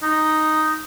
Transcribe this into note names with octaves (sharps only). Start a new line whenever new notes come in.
D#4